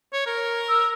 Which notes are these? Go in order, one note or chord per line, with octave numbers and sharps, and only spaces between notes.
C#5
A#4
E6